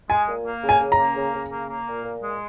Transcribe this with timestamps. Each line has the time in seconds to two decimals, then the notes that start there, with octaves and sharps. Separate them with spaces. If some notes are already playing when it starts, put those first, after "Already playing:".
0.09 G#3 G#5
0.27 A#2
0.45 A#3
0.63 C#3
0.69 G#5
0.80 C#3
0.92 A#5
0.98 A#3
1.16 C#3
1.34 C#3
1.52 A#3
1.69 A#3
1.87 A#2
2.04 A#2
2.23 G#3